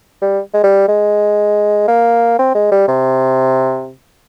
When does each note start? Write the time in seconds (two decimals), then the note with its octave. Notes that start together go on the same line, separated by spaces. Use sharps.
0.22 G3
0.54 G#3
0.64 G3
0.88 G#3
1.88 A#3
2.39 C4
2.55 G#3
2.72 G3
2.88 C3